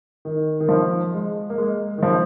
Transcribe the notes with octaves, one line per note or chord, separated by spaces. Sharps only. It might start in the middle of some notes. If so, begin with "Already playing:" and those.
D#3
D#3
F3
G#3
A#3
G#3
D#3
F3